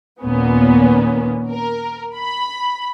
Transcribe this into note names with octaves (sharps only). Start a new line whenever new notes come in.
D#2 A#2 A#3 B3 C#4
A#4
B5